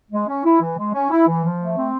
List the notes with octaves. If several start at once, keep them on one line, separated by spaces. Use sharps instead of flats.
G#3
C#4
E4
E3
G#3
C#4
E4
E3
F3
A3
C4